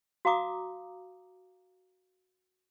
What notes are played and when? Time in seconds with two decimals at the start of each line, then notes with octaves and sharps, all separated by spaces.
0.25 F#4 F5 A#5 D6 D#6